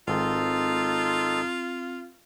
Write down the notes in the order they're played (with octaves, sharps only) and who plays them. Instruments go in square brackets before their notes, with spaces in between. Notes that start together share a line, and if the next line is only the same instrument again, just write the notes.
[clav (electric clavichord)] G#1 [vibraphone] C4 [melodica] D#4 A4 C6 [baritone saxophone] F4